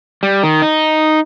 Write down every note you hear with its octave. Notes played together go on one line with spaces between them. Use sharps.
G3
D#3
D#4